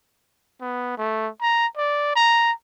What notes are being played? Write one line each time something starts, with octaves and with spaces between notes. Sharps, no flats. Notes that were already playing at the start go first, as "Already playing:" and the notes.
B3
A3
A#5
D5
A#5